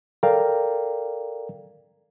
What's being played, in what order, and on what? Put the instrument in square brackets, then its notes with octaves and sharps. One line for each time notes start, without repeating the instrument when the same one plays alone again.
[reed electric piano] A4 A#4 D5 F5 G5 A#5